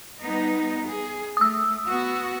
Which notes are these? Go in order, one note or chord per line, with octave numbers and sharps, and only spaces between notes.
G3 B3 D#4
G#4
A3 D#6 E6
B3 F#4